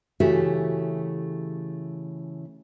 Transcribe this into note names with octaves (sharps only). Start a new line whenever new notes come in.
C#3 E3 A3 F#4 G4 E5